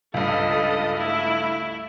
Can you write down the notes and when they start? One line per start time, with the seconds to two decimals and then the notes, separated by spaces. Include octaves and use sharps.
0.14 C#2 G2 A4 D#5
0.97 A3 E4